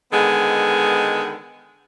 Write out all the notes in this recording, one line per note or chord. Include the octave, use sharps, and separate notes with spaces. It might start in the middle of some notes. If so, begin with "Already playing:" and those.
D3 D#3 G#3 B3